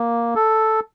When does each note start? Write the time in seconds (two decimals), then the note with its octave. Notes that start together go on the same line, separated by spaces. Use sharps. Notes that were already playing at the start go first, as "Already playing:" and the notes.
Already playing: A#3
0.35 A4